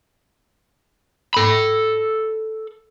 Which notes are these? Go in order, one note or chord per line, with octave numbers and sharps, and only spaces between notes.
A4 B5